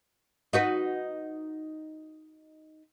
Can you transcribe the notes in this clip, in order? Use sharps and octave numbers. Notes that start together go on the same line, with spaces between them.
D#4 F#4 B4